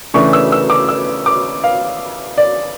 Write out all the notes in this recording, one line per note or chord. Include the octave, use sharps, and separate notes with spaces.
C#3 E3 A3 D4 C#6
E6
E6
D6
E6
D6
F5
D5